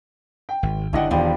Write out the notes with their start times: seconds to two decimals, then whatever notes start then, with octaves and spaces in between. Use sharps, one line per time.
0.49 G5
0.63 G#1
0.93 G1 D3 D4 E4 G4 D#5 F#5
1.11 E1 D#3 F3 G3 D4